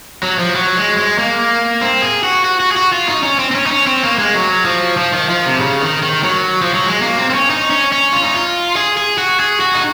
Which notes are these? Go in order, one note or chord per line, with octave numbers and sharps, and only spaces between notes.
F#3
F3
F#3
G#3
G#3
A#3
C4
G#4
F#4
F#4
F#4
G#4
F#4
F4
D#4
C#4
C4
C4
C#4
D#4
C#4
C4
A#3
G#3
F#3
F3
F3
D#3
F3
C3
C#3
D#3
D#3
F#3
F3
F#3
G#3
A#3
C4
C4
C#4
D#4
C#4
C#4
F4
D#4
F4
G#4
G#4
F#4
G#4
F#4
D#4